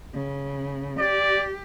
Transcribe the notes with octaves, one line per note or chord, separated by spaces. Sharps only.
C#3
G4 D5